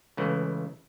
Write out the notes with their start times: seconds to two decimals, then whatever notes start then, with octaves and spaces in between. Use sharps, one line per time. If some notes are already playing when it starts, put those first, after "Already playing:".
0.17 C#2 C#3 E3 A3